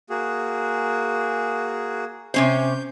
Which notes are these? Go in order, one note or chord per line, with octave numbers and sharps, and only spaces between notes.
A#3 F#4 G#4
C3 C#4 C5 G6